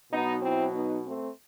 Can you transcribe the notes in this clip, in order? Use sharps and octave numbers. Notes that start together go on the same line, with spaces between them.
B2 F#3 B3 D#4
C4 E4
B3 D#4
A3 C4